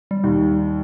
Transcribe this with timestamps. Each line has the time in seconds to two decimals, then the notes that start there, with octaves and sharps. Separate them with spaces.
0.11 G3
0.24 D#2